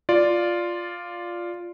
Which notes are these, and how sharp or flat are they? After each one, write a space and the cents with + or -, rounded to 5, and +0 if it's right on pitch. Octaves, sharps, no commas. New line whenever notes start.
F4 +0 D5 +0